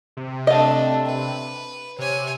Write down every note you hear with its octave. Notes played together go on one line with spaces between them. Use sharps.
C3
A3 D4 D#5 F5
B4
C3 C#5 G#5